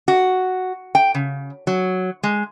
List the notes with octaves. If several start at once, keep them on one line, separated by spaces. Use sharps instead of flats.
F#4
G5
C#3
F#3
G#3